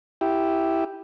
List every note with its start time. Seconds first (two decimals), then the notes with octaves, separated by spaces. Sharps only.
0.21 E4 G4